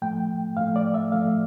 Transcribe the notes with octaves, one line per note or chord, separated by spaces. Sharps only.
A2 F3 A3 G5
A2 F3 A3 F5
D5
E5
A2 F3 A3 F5